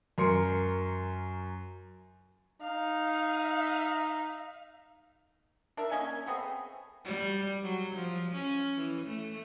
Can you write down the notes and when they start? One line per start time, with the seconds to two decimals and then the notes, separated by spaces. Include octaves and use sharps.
0.18 F#2 A#4 C6 C#7
2.61 D#4 F5
5.77 D4 A#4 E5
5.91 A#3 C#4 D#5 G#5
6.26 A3 B3 C4 G#4
7.05 G3
7.63 F#3
7.95 F3
8.32 C#4
8.76 E3
9.07 A3